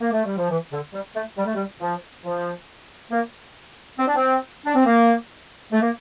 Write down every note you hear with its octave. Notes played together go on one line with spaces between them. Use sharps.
A#3
A3
G3
F3
E3
D3
G3
A3
G3
A3
G3
F3
F3
A#3
C4
D4
C4
D4
C4
A#3
A3
A#3